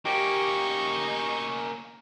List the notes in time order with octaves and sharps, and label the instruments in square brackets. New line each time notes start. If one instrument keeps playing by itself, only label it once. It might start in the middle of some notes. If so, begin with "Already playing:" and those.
[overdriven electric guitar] A#3 C#4 [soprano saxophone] D#4 [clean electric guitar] G4 [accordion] C#6